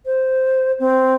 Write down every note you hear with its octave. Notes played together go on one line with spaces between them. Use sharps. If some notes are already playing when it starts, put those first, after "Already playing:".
C5
C4